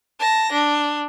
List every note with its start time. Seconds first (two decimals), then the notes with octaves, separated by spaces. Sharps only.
0.20 A5 A#6
0.52 D4